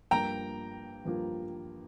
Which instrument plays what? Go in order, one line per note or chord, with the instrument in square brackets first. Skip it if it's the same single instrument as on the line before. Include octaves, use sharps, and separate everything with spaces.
[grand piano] G2 F3 A#3 F4 [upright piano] G5 A#5
[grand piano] G2 F3 A#3 F4